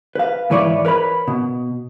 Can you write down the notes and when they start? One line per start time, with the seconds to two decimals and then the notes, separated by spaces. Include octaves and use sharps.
0.15 B4 F5
0.50 G#2 E3 B4 C#5 D5 E5
0.85 A#4 B4 C#5 B5
1.28 B2